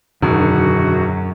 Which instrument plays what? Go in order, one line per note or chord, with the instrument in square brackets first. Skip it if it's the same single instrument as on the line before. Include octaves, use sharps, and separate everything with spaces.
[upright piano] E1 D#3 [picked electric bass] F#2 [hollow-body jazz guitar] D3 [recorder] F#4